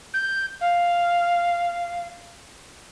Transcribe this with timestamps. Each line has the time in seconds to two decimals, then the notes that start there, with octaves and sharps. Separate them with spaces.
0.14 G6
0.61 F5